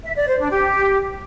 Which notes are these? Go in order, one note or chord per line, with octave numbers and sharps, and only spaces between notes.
E5
D5
C5
D4
G4